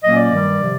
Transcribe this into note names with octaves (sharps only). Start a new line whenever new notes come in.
A#2 F#3 A#3 C#4 D#5
D5
G2 D#3 G3
C3 F3